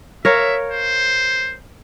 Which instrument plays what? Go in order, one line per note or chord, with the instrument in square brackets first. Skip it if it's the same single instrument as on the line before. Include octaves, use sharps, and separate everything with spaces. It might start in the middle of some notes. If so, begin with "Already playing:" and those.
[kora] A#4 C#5 F5 [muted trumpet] E5
[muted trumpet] C5